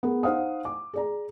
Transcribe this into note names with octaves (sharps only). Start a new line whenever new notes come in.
B3 G#4 A#4
D#4 C5 F5 F#5 D#6
D6
G#4 D5 A#5